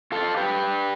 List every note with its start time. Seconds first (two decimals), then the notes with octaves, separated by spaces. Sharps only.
0.12 F4 A4
0.37 G4 B4